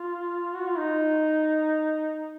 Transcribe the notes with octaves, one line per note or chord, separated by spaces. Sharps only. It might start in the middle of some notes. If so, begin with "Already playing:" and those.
Already playing: F4
F#4
F4
D#4